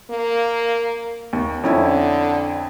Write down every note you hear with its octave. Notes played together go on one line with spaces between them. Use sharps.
A#3
D#2
F2 D3 C#4 E4